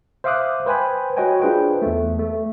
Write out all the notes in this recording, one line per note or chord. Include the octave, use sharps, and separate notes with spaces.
C5 E5 F5 D6 D#6 F#6
B4 C5 G5 G#5 B5
F#4 B4 C#5 D#5 G5 G#5
D4 F4 G#4 B4 C5 G5
E2 A3
A3